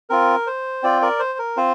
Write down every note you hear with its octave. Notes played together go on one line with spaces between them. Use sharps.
C4 F4 A#4
C5
C4 F4 D5 G5
A#4 D5
C5
A#4
C4 F4 C5